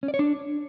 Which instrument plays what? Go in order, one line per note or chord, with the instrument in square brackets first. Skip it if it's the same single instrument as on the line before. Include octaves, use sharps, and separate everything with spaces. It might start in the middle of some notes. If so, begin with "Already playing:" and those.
[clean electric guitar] C#4
D5
C#5
D4